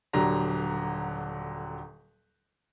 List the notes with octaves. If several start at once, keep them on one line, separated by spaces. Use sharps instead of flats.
D#1 D3 F#3 G4 A#5